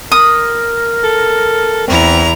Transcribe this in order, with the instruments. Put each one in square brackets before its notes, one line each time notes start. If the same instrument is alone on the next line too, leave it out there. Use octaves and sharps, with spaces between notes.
[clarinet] A#4 [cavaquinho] D#6
[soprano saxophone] A4
[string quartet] E2 E4 A#5 [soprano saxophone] C4